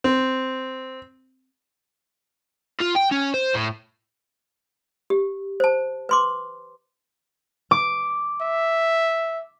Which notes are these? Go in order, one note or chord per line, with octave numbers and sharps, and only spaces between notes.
C4
F4
G5
C#4
C5
A2
G4
C5 A5
B4 C6 D6
D6
E5